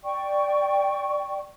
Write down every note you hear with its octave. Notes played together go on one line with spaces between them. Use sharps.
D5 G5 C#6